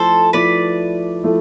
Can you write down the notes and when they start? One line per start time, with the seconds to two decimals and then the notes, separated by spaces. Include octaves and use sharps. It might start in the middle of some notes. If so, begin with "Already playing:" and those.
Already playing: F3 A3 E4 A4 C5
0.33 F3 A3 E4 B4 D5
1.24 F3 A3 E4